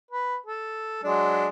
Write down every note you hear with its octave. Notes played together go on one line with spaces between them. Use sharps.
B4
A4
F#3 G#3 D4